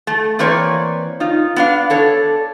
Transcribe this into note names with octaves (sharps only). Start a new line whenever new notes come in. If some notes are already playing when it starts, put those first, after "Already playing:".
A3
E3 A#3 C4 B4 C#5 D5
D#4 F4
B3 D4 F5
D4 A4 C#5